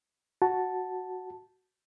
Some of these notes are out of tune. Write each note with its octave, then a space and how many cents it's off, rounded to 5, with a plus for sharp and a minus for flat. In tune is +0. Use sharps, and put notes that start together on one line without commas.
F#4 +0 A5 +0